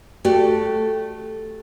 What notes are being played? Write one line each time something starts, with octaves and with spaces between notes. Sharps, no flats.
A3 F#4 G4 A4 D5